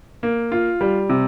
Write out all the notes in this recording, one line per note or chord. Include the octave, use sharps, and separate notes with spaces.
A#3
F4
G3
C3